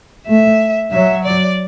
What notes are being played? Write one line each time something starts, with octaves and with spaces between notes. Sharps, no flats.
A3 E5
F#3 E5
D5